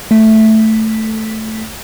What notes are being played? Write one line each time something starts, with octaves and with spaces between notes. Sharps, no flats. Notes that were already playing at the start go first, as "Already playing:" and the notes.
A3 B6